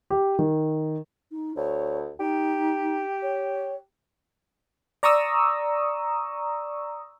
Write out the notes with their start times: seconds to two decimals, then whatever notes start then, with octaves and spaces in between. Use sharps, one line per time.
0.10 G4
0.39 D#3
1.31 D#4
1.56 D2 C#5
2.20 D#4 G4
3.22 C#5
5.03 D5 A#5 C#6 D#6 E6